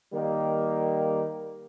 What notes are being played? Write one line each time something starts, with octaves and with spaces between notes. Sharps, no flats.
D#3 G3 A#3